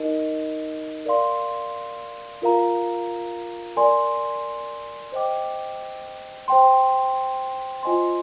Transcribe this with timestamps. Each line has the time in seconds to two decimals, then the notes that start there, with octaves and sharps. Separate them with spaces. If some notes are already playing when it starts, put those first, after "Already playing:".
Already playing: D#4 A#4 D#5
1.05 A#4 D5 F5 C6
2.42 F4 A#4 F5 A#5
3.76 A#4 D5 G#5 C6
5.12 C5 D#5 G5 D6
6.48 C5 G5 C6
7.83 F4 C5 D#5 G#5 C6